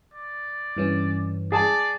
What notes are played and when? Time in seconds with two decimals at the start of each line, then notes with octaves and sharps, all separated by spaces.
0.14 D5
0.77 G2 E3 C#4
1.52 G#4 D5 A5